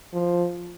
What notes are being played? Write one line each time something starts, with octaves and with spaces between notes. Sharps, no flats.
F3